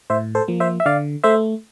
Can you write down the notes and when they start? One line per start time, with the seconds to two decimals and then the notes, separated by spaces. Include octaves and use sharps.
0.10 A2 C5 E5
0.35 A4 C5
0.48 F3 A#3
0.60 C5 E5
0.80 E5
0.86 D3 D5 F5
1.24 A3 C5 E5